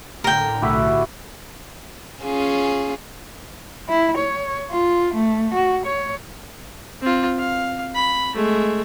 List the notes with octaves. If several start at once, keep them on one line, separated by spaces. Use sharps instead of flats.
A2 D3 A#4 G5
B1 A3 E4 F#4 G4 B5
C#4 F4 G#4
E4
C#5
F4
A3
F#4
C#5
C4 F4
F5
B5
G#3 A3